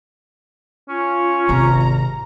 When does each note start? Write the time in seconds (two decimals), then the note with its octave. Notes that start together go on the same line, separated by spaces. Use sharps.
0.89 C#4 F4
1.49 G#1 C3 A#5